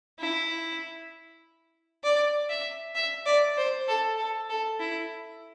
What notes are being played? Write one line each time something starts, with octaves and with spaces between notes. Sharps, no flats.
E4
D5
E5
E5
D5
C5
A4
A4
A4
E4